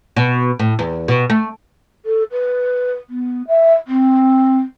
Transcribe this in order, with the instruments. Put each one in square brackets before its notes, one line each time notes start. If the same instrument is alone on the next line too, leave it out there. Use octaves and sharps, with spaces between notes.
[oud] B2
A2
E2
B2
A3
[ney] A4
B4
B3
E5
C4